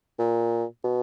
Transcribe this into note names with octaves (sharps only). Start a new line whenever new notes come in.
A#2
B2